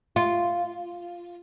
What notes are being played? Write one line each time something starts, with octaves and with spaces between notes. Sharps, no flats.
F4